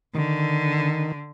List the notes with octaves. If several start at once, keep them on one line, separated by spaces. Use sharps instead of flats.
D3 D#3